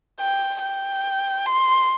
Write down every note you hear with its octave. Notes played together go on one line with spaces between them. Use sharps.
G5
G5
C6